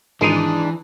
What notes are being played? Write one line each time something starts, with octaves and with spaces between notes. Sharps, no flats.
G#1 E3 G#3 D4 D#4 C7 D#7